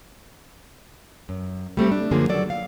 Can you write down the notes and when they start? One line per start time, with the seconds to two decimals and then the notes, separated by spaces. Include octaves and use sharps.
1.29 F#2
1.77 G3 A3 C4 G4
1.92 D4
2.11 F#2 D3 F3 A#3 G#4
2.29 D#3 F#3 A4 D5
2.50 F5